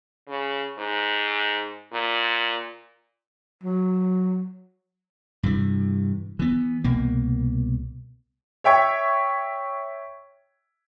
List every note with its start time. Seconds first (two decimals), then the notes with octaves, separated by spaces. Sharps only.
0.28 C#3
0.78 G#2
1.92 A#2
3.63 F#3
5.43 G2 C3 E3
6.39 E3 B3
6.84 C2 B2 A#3
8.64 C#5 E5 G5 C#6 G#6